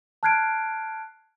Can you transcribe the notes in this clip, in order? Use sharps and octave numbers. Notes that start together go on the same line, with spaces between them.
A5 F6 F#6 G#6 C7 D7